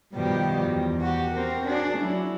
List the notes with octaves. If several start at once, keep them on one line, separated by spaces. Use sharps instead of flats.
G2 B2 D#3 F3 G3 G4
E2
F#4 G4
C4 A#4
D4 F#4 G#4 D5
F#3 E4